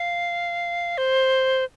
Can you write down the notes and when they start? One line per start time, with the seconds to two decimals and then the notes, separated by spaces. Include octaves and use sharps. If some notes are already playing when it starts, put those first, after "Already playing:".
Already playing: F5
0.98 C5